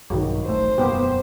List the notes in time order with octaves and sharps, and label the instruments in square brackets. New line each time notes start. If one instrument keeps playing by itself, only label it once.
[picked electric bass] A#1 G2 B2 [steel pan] D#3 F#3
[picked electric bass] D#1 A1 A3 [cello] C5
[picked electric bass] E1 F#2 B2 [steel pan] A#3 B3 G4